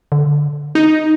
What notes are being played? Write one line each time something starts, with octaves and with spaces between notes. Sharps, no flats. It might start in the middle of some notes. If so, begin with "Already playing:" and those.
D3
D#4